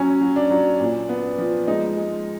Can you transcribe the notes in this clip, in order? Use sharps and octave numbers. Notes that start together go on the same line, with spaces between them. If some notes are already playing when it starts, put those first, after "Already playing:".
Already playing: F#3 C#4
F#3
D4
F#3
A#2
B3
F3
G#3 D#4
G#3